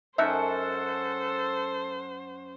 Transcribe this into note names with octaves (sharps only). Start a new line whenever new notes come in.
F#2 D#4 A4 C5 E5 F#5 A5